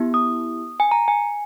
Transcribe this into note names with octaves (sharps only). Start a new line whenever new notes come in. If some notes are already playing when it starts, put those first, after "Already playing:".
Already playing: B3 E4 G4
D#6
G#5
A#5
G#5